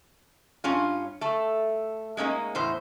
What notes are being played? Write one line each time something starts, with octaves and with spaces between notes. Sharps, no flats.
G2 C#4 F4
A3 A4
G#3 A#3 C#4 D#4
E2 A2 C5